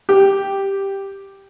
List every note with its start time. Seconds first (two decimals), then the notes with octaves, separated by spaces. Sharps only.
0.09 G4